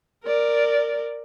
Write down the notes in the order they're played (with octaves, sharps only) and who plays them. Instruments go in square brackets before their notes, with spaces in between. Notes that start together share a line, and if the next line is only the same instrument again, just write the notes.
[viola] A#4 D5